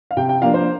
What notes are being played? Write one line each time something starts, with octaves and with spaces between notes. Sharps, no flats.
F5
C3 G5
G5
F3 A#3 D4 F5
C5